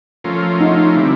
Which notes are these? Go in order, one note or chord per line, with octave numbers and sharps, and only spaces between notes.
F3 A3 C#4 F4 A#4
D#4
D3 G3 C4 E4